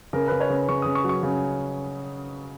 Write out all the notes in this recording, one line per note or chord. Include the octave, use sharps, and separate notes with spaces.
C#3 A#4
C#3 B4
C#5
C#3
C#3 C#6
C#3 D#6
C#6
F#3
C#6
C#3